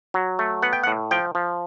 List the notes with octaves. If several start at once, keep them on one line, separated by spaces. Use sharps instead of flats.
F#3
A3
B3 F#5
G5
F#5
A2
F3 G5
F3